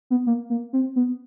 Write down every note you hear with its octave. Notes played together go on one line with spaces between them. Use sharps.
B3
A#3
A#3
C4
B3